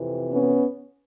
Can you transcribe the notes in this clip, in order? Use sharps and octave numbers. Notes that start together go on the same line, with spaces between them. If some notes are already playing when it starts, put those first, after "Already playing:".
Already playing: F2 C3 E3
B3 C#4